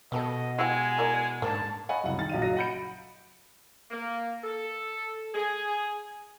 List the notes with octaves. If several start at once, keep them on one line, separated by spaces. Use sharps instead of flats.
B2 G3 B3 A4 D#5
G#3 E4 G4 F#5 G#5
E4 A#4 D5
G#2 A#3 C#4 D4 A5
C#5 D#5 F#5 G#5 B5
C2 F#2 C#3 F#5
D#3 A6
A#1 F#3 D#5 F5 D#7
F#1 F#3 D#5 F5 A#6
F#5 B5 G6 C#7 D7
A#3
A4
G#4